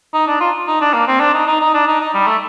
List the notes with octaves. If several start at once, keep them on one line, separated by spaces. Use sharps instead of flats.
D#4
D4
F4
D#4
D4
A#3
C4
D4
D#4
D#4
D#4
D4
D#4
D#4
G3
A3